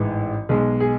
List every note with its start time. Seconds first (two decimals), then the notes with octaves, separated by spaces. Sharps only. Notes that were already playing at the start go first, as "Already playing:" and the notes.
Already playing: A1 G#2 E3 G#3
0.49 B1 B2 G#3 G#4
0.80 G#4